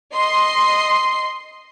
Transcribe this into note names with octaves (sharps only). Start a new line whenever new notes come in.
D#5 C6 C7